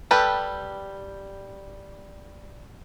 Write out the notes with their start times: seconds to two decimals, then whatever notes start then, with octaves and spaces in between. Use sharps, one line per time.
0.11 G3 G4 A4 B4